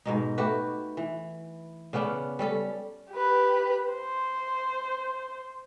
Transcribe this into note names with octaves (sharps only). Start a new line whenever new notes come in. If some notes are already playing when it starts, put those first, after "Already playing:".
G#2 B2 D#4
A3 F#4 G4 B4
E3
C#3 B3 C#4 D4
G3 C#4 A4
G4 B4
C5